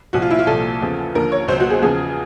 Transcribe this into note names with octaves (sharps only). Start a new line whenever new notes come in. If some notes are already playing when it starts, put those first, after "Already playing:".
C2 A#2 F3 F#4
F4
E4
F4
C2 A#2 F3 A4
E2 C#3 F3
D#2 D3 F3 A#4
C#5
C#2 B2 F#3 C5
F#4
G#4
E2 C#3 F3 G#4